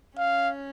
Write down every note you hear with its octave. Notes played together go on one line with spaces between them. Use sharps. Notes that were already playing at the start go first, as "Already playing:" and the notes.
C#4 F5